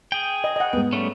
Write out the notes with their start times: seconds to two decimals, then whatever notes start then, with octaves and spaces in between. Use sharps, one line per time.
0.12 G#4 G5
0.44 D#5
0.56 D#5 F#5
0.73 G#2 B3
0.93 G3 A3 C#4